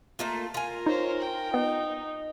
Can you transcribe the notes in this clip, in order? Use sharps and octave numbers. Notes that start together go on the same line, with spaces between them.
A3 A#3 F4
F4 A#4 G#5
D#4 C5 C#5
G5
B3 D#4